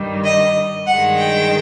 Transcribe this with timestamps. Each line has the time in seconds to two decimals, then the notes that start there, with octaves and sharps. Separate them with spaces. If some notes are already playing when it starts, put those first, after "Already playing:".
Already playing: G2 D#3 G3
0.24 D#5
0.86 G2 D#3 G#3 F#5
1.18 G5